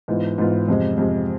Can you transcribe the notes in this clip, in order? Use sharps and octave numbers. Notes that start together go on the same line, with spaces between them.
G#2 E3 B3 F4
G#2 E3 B3 F4
F2 C3 G#3
F2 C3 G#3